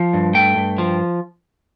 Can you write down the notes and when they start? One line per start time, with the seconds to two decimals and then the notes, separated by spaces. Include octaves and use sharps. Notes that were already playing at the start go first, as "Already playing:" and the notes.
Already playing: F3
0.13 G2
0.34 A3 G5
0.56 G2
0.78 F3